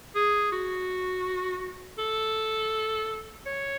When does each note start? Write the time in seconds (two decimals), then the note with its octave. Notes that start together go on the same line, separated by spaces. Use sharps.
0.15 G#4
0.52 F#4
1.99 A4
3.46 C#5